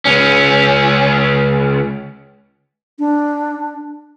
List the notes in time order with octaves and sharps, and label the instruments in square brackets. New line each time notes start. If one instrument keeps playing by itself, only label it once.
[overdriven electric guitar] C#2 C#4
[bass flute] D4